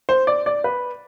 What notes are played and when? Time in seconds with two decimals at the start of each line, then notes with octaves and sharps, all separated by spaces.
0.09 C5
0.27 D5
0.46 D5
0.64 B4